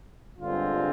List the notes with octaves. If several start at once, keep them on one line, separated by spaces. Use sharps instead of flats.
G1 G2 D3 G#3 C4 F4